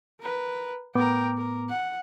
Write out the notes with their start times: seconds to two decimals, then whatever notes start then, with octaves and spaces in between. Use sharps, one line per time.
0.20 A#4 B4
0.95 A2 B3 A#4 G5 D6
1.37 A#4
1.69 F#5